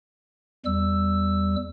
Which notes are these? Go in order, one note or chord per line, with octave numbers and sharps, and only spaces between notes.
E2 G3 E6